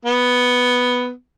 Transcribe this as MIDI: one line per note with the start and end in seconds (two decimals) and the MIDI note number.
0.05 1.10 59